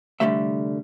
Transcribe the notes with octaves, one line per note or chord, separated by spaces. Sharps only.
C2 D3 F3 G3 A3 E5